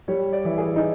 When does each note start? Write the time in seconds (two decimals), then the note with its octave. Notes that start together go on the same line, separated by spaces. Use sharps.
0.08 G3 C#5
0.33 D5
0.45 E3
0.58 G#4
0.76 D#4